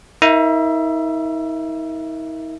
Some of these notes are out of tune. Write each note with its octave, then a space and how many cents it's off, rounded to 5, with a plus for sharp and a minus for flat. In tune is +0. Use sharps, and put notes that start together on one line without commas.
D#4 +45 A#4 -10 E5 +25